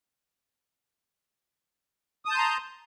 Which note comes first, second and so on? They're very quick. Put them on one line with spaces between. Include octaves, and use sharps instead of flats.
D#6 A5 G6 C6 A#5